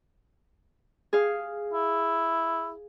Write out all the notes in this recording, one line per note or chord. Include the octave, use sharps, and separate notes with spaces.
G#4 F5
E4